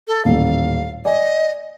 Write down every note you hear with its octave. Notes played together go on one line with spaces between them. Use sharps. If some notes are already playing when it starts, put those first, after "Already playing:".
A4
D#1 A1 F5
D5 D#5 G#5